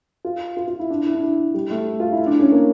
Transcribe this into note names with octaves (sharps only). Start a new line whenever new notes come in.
F4
F4
F4
E4
D4
E4
D4
E4
G3
A3
F4
E4
D4
C#4
A#3